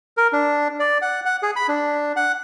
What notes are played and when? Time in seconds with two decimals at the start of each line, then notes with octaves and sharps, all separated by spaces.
0.17 A#4
0.33 D4
0.80 D5
1.02 F#5
1.25 F#5
1.43 G#4
1.56 B5
1.68 D4
2.16 F#5